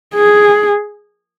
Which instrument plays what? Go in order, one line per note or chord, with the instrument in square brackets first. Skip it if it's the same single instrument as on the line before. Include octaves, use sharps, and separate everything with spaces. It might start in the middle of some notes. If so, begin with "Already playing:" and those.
[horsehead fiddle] G#4